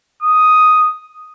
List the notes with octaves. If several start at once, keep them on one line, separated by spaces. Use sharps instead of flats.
D#6